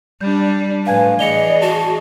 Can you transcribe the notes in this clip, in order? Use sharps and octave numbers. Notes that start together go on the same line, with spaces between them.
G3 D4 G6
A2 F3 B4 F5 G#5 G#6
E3 G#4 D5 D#5 C#7 F7 G7
F#4 A5